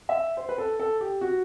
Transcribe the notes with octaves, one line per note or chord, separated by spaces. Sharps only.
E5
C5
B4
A4
A4
G4
F#4